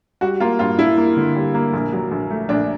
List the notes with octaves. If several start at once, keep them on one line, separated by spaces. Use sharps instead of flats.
G3 F#4
A#3 F4
G2 F4
G2 E4
A#3
D3
G3
A#3
A#1
F#3
A#1
A3
A#1 D4